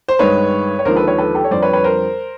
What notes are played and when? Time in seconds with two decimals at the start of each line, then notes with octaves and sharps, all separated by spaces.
0.08 C5
0.19 G2 D#3 G#3 B4 C#5
0.79 C#5
0.85 D#2 D3 F3 G#3 A#4 C5
0.96 A4 B4
1.07 B4 C#5
1.18 A4 B4
1.35 G4 A4
1.44 C#5
1.51 F2 D3 G3 C5 D5
1.63 B4 C#5
1.73 B4 C#5
1.84 A#4 C5